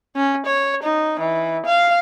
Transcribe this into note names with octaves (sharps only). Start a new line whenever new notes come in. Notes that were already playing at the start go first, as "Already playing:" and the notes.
C#4
C#5
D#4
E3
F5